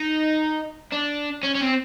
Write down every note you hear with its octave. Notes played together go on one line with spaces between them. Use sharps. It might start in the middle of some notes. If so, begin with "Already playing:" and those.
Already playing: D#4
D4
C#4
C#4
C4